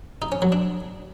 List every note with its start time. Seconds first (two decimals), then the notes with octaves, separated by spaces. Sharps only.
0.22 D#4
0.32 C#4
0.42 F#3
0.52 D4